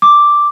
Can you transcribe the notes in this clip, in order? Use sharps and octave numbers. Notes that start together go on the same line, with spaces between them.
D6